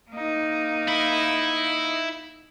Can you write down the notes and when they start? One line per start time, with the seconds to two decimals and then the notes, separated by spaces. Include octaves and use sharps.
0.11 A#3 D#4
0.88 E4